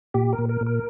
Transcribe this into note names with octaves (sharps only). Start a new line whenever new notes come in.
A#2 G4
A#4
A#2
A#4
A#2
A#4